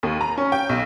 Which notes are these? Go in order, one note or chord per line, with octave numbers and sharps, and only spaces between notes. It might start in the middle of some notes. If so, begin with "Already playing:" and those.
D#2
A#5
C#4
G5
B1